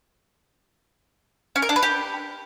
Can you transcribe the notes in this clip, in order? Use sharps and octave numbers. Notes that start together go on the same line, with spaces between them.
C#4
A#4
D4
B4
G4